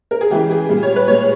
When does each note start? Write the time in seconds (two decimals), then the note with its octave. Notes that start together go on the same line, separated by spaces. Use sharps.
0.11 A#4
0.21 G#4
0.30 C#3 E3 G#3 G4
0.51 G#4
0.69 A#2 G3
0.83 C#5
0.96 B4
1.08 A#2 G#3 C#5